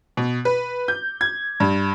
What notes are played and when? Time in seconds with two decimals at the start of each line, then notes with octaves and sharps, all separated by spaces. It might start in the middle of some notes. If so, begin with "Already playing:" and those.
0.17 B2
0.45 B4
0.88 G6
1.21 G#6
1.60 G2